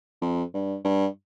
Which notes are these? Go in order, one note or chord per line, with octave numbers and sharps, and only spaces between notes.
F2
G2
G2